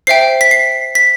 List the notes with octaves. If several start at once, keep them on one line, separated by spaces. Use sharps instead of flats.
C5 E5 G5 C7
B6
C7
B6